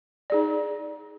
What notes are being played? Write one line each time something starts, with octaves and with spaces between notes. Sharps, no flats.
D#4 G#4 D5